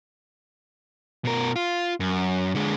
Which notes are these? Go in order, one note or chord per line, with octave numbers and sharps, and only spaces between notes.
B2 A#4
F4
F#2
D3 G#3